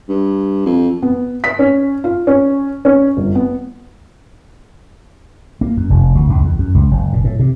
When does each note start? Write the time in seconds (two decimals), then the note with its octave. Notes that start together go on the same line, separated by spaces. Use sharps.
0.09 G2
0.66 F2
1.02 B3
1.44 B6
1.59 C#4
2.04 F4
2.27 C#4
2.85 C#4
3.17 G1
3.35 B3
5.61 A#3
5.77 F#2
5.90 F1
6.15 D2
6.30 C#2
6.44 E2
6.59 F#2
6.75 C#2
6.91 F#1
7.13 A#2
7.24 A2
7.39 C3